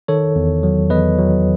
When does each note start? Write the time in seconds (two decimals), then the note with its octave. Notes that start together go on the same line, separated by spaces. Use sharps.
0.08 D#3 A4 C#5
0.36 E2
0.63 F#3
0.90 E2 B4 D#5
1.18 F#3